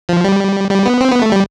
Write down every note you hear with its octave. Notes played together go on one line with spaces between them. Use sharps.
F3
G3
G3
B3
C4
B3
A3
G3